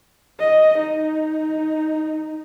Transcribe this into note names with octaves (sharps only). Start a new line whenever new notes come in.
D#5
D#4